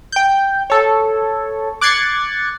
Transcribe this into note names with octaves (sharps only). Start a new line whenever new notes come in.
G5 G6
A4 C#5
D6 F#6 G#6 A6 C7 C#7